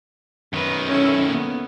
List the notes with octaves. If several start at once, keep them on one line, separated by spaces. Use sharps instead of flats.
F#2 D#3 B4
C#4 E4 A4
A#3 B3